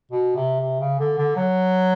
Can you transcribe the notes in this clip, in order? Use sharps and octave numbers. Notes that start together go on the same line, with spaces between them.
B2
C3
C3
C#3
D3
D3
F#3